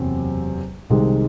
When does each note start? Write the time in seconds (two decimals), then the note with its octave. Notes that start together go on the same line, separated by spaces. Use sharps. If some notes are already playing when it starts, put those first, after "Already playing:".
Already playing: F#1 E2 C3 F#3 C4
0.90 C2 C3 D#3 G#3